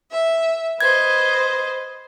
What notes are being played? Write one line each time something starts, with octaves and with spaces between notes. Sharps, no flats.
E5
B4 C5 D#5 G#6